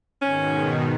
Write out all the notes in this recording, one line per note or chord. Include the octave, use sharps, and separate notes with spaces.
G#2 B2 D#3 C#4